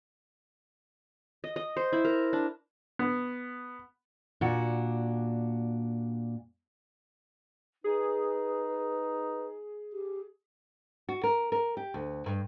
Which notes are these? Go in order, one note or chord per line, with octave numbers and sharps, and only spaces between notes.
D#5
D#5
C5
E4
A#4
D4
B3
A#2 D4 F#4
D#4 G#4 B4
G4
F#4
A#4
A#4
G4
D2
G2